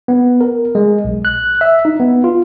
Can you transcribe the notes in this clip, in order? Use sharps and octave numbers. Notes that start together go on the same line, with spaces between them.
B3
A#4
G#3
B1
F#6
E5
D#4
B3
F4